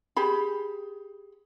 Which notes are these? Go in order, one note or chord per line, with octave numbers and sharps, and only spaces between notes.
G4 G#4 B5